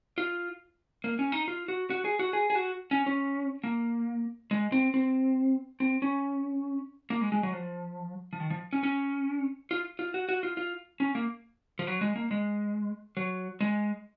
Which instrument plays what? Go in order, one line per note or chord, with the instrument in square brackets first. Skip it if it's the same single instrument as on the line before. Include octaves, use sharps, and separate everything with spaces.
[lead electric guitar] F4
A#3
C#4
D#4
F4
F#4
F#4
G#4
F#4
G#4
G#4
F#4
C#4
C#4
A#3
G#3
C4
C4
C4
C#4
A#3
G#3
G#3
F#3
F3
F3
D#3
F3
C#4
C#4
F4
F4
F#4
F#4
F4
F4
C#4
A#3
F3
F#3
G#3
A#3
G#3
F#3
G#3